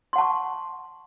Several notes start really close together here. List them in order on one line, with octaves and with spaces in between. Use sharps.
C6 F#5 A5 C#6